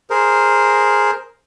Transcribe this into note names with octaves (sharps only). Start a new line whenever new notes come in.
G#4 A#4 C5